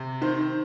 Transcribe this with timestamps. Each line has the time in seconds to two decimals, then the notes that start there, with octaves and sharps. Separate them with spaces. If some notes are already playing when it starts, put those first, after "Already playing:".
Already playing: C3
0.21 D#3 C5